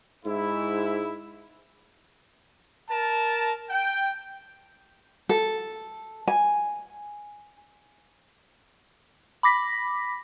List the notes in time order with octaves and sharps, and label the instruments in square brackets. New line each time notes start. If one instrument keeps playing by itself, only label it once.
[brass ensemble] G#2 E4
[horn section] A#4 A5
G5
[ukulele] A4
G#5
[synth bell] B5 D6 A#6 B6